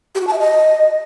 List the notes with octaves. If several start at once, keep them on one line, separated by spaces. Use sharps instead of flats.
G4
F#4
A5
E5
D#5